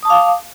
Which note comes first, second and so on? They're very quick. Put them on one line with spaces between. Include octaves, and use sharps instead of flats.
D#6 A5 D6 F5